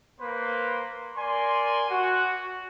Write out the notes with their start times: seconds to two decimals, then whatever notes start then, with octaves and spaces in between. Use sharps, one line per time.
0.19 A#3 B4 C5
1.17 A#4 D5 G#5 C6
1.91 F#4